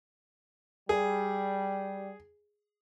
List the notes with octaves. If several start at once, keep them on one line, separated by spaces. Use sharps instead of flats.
G3 G#4